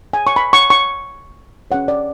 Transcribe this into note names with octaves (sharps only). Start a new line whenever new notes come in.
G#5
C#6
B5
C#6
C#6
C#4 G#4 C#5 F#5
D5